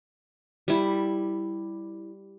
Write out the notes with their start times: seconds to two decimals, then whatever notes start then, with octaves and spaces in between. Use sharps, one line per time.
0.68 G3 E4